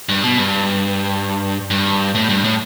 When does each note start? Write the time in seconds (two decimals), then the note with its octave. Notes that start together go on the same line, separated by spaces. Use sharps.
0.09 G2
0.23 B2
0.38 G2
1.71 G2
2.15 A2
2.29 G2
2.44 A2